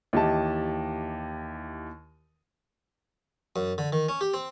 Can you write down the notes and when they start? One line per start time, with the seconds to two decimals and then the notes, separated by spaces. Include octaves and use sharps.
0.13 D#2 E3 G4 D#5 A5
3.56 F#2
3.78 D3
3.93 D#3
4.09 C#4
4.21 G4
4.34 C4